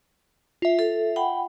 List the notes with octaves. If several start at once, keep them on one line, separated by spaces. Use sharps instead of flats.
F4 E5
A4
F#5 G5 B5